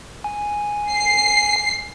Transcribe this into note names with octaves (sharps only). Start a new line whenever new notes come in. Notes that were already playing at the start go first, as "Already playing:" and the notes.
G#5
C7